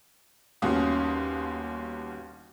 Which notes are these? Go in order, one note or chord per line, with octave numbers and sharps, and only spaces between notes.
G1 D#2 C#4 F#4 F5 D#6